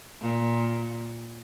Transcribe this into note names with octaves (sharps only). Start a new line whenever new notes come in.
A#2